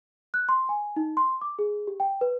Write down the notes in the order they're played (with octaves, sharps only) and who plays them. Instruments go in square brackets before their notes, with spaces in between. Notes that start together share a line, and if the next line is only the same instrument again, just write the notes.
[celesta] F#6
C6
G#5
D#4
C6
D6
G#4
G4
G5
B4